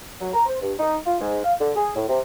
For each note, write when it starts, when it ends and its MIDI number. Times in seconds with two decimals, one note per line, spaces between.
0.20 0.28 54
0.34 0.45 82
0.46 0.55 72
0.60 0.72 43
0.78 0.96 63
1.05 1.20 65
1.20 1.37 44
1.43 1.53 77
1.59 1.72 50
1.74 1.93 68
1.96 2.05 45
2.08 2.19 48